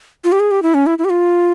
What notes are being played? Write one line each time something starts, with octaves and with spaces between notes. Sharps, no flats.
F4
G4
G#4
G4
E4
C#4
E4
E4
G4
F4